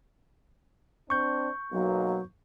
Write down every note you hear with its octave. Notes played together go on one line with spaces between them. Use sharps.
C4 D4 C#6 G6
B1 B2 F#3 A#3